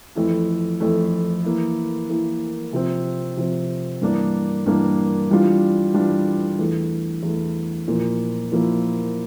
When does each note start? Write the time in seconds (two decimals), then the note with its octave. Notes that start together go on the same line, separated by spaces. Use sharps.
0.15 F2 E3 A3 E4
0.80 F2 E3 A3 E4
1.44 E3 A#3 E4
2.09 E3 A#3 E4
2.73 C3 F3 C4
3.37 C3 F3 C4
4.02 G2 E3 A#3 D4
4.66 G2 E3 A#3 D4
5.31 E3 G3 D4 F4
5.94 E3 G3 D4 F4
6.59 E2 E3 A3
7.23 E2 E3 A3
7.88 A#2 F3 A#3 E4
8.52 A#2 F3 A#3 E4